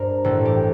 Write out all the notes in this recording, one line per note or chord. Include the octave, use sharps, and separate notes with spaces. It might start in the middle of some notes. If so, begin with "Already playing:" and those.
Already playing: G2 A#4 C5 D5
A1 A4
G4